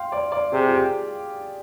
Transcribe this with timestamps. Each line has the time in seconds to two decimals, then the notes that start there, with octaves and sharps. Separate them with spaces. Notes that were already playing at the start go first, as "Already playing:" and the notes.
Already playing: F5 G5 C6
0.12 D5
0.32 D5
0.52 C3 G#4
0.67 F4
0.73 G4